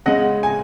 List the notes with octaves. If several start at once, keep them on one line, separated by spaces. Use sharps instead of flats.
C#3 G#3 D#5 F#5
G#5